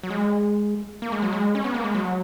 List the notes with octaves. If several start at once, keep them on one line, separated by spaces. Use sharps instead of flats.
F#3
G#3
A#3
G#3
F#3
G#3
C#4
B3
A#3
G#3
F#3